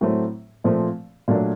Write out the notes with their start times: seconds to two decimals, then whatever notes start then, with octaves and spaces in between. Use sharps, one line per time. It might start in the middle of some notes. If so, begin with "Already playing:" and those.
0.01 A2 F#3 A3 C4
0.64 A#2 F3 A3 C4
1.28 A#2 F#3 A3 D4